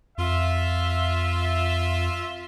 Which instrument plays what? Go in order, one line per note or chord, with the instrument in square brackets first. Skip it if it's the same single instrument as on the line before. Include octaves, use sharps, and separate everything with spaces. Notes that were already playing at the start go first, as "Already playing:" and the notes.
[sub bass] F2 [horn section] F4 E5